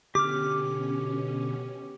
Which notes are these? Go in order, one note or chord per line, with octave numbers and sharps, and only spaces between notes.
B2 D3 C#4 G4 D6 F6